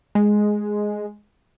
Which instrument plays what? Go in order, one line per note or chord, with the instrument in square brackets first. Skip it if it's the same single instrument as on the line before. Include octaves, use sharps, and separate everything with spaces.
[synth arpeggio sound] G#3